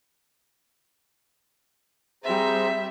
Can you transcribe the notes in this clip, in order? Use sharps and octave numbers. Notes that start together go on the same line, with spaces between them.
G3 C4 G#4 C5 E5 A#5